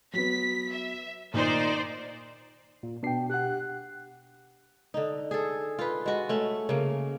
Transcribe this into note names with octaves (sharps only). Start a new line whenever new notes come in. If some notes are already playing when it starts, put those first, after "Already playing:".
F#3 B3 B6
E5
A#2 D#3 D#4 C5 D5
A#2
B2 B3 D4 G5 C7
G4 F#5 F#6
D3 D#4
G#4 A4
F4 B4
G#3 F#4
A3 C#4
C#3 A#3